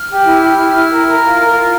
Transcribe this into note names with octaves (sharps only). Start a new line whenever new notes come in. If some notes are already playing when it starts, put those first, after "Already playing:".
Already playing: F6
G4
E4
G4
E4
E4
A#4
A#4
F4
A#4
F4